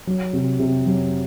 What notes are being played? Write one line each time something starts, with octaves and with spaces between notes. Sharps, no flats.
F#3
C3
C3
F#3